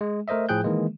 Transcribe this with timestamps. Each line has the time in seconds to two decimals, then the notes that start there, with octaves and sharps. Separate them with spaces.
0.01 G#3
0.28 A3 A#4 C5 D#5 E5
0.49 A2 F3 G#4 G5 F#6 G6
0.64 D#3 E3 G#3 A#3